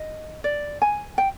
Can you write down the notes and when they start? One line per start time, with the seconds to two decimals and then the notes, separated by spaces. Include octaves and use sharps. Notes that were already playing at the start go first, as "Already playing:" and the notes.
Already playing: D#5
0.44 D5
0.82 G#5
1.18 G5